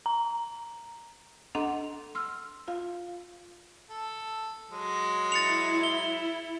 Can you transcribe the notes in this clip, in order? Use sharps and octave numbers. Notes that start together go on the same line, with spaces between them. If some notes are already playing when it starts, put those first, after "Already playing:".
A#5
D4 A4 D#5 F#5 A#5 C6
C6 E6 F6
F4 F5
A4
F#3 G#3
E4 A6 C#7 F7
G7